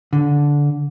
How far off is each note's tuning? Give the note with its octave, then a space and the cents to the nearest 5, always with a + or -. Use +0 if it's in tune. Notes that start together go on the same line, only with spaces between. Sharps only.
D3 -15